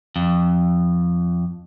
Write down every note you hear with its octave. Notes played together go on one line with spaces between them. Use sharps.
F2